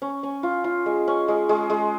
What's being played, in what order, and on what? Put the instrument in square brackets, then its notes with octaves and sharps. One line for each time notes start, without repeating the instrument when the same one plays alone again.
[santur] C#4
C#4
F4
F4
G#3
C#4
G#3
G#3
G#3